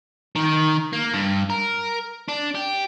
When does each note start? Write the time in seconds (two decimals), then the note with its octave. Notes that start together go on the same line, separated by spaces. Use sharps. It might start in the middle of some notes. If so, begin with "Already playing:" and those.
0.36 D#3
0.93 A#3
1.14 G2
1.50 A#4
2.28 D4
2.55 G4